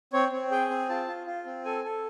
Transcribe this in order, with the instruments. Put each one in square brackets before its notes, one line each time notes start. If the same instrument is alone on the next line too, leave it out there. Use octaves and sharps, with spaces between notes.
[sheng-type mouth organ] C4 C#5
C4
G#4 G5
C4
F4 A5
F4
F4
C4
A4 G#5
A4